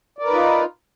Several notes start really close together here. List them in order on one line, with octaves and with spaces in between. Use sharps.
D5 A#4 B4 D#4 F4